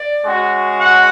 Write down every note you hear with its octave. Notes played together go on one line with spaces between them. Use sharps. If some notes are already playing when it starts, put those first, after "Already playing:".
Already playing: D5
G#3 C#4 F#4
F#5